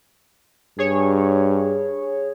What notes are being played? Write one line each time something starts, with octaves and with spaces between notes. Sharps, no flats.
G2 G#4 C#5